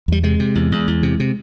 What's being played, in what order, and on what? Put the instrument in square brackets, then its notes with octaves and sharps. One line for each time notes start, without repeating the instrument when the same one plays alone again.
[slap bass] E2 G3
C3 G#3
C3
E2
E2
E2
C3
C3